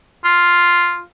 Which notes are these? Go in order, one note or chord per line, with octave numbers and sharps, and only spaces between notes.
F4